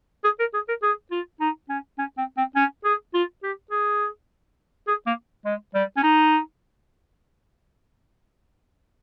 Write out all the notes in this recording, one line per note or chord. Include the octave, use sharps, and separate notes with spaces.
G#4
A#4
G#4
A#4
G#4
F4
D#4
C#4
C#4
C4
C4
C#4
G#4
F4
G4
G#4
G#4
A#3
G#3
G3
C#4
D#4